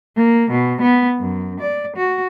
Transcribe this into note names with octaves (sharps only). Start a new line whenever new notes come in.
A#3
B2
B3
F#2
D5
F#4